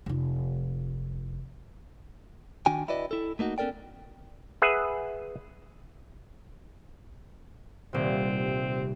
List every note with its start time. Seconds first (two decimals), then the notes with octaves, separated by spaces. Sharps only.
0.06 F1 F4
2.66 D#3 D4 F#4 G5 G#5
2.88 E4 F#4 B4 D5 D#5
3.11 E4 A4
3.39 A3 A#3 D#4 F#4
3.58 B3 C#4 A4 A#4 D5 G5
4.62 G#4 B4 E5 F#5
7.93 D#1 C3 C4